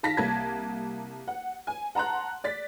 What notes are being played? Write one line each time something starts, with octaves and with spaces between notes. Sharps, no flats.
D#3 F5 A5 A#6 B6
C2 A#3 A5 G#6
F#5
G#5
F#5 A5 A#5 C6 F#6
D5 A6 B6